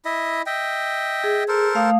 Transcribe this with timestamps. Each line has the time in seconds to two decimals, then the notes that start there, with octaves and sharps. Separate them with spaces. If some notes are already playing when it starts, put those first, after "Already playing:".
0.05 E4 D#5 E5
0.46 D#5 E5 G5
1.24 G#4
1.48 A4 A#4 C5
1.75 A3 F5 D#6